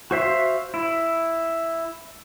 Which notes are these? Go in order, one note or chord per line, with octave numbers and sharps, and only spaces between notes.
F#4 C5 E5 F5
E4